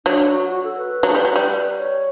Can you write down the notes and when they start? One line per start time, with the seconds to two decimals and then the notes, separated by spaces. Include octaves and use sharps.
0.05 F#3 D4
0.27 F#4
0.49 F#4
0.64 A4
0.78 B4
1.03 F#3
1.09 A3
1.15 G3
1.25 F#3
1.36 G3
1.79 C#5